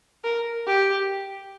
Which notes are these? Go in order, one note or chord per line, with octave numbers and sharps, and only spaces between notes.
A#4
G4